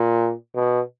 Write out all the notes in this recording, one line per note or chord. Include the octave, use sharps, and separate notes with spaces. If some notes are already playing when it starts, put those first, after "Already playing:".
Already playing: A#2
B2